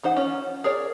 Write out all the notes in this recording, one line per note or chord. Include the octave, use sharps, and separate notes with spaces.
E3 D#4 C5 F#5
C#4 F4
G#4 A#4 C#5 D5